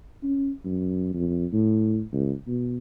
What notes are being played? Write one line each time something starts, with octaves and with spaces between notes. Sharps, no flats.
C#4
F#2
F2
A2
C#2
B2